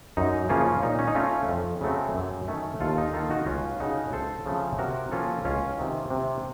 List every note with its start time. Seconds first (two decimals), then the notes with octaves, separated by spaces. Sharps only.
0.17 F#2 D#4
0.49 C#3 F3 A#3 C#4 F4
0.83 A#2 D#4
0.99 C#4
1.08 D#4
1.15 A3 C#4 F4
1.48 F2
1.81 C#3 F#3 A3 C4
2.15 F#2
2.48 D#3 A3 C#4
2.80 D#2 F4 A4
2.98 D#4
3.14 D#3 A#3 F4 A4
3.30 D#4 F#4
3.46 C#2 C#4 F4
3.79 C#3 A3 D#4 F#4
4.12 C#2 A4 C5
4.46 C#3 F3 A3 C4
4.79 C3 F#4 A#4
5.12 F3 A#3 C#4 F4 A4
5.45 C#2 C#4 F4
5.79 C3 D#3
6.10 C3